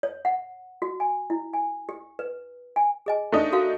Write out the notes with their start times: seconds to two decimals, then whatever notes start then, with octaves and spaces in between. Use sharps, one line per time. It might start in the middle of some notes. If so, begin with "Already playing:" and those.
0.03 C#5
0.25 F#5
0.82 F#4
1.00 G#5
1.30 E4
1.53 G#5
1.89 G4
2.19 B4
2.76 G#5
3.06 G#4 D#5 G#5
3.32 A3 D4 D#4
3.52 F#4 A#4 F5